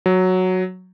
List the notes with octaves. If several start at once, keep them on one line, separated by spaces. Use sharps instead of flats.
F#3